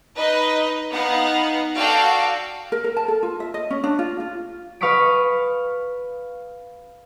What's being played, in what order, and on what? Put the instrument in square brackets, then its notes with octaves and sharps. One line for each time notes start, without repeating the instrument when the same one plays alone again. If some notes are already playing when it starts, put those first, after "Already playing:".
[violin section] D#4 B4 D#5
B3 D#4 F5 F#5
F#4 A4 D5 F5 G5
[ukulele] A#4
A#4
A5
A4
F4
E5
D#5
C#4
D4
F4
F4
[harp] B4 F5 C#6 D#6 B6 D7